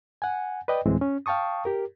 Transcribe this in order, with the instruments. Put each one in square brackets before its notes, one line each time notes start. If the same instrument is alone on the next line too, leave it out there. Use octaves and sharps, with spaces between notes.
[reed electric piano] F#5 G#5
B4 D5 D#5 G5
D2 A2 E3 G#3 C4
C#4
F5 G5 A5 C#6 D#6
G4 A#4